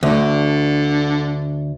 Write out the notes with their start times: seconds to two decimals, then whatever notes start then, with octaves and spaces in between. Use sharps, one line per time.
0.03 D2 D3